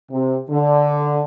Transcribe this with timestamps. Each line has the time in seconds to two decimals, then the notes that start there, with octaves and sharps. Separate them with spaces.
0.11 C3
0.50 D3